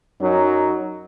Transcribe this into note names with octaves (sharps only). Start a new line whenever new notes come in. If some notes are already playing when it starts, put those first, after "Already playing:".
F#2 F#3 D#4